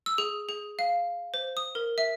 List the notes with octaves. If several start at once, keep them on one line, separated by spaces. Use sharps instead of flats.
E6
G#4
G#4
F5
C5
D#6
A#4
E5